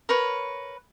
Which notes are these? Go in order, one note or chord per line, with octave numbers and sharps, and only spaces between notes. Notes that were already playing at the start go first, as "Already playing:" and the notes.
A#4 B4 C#5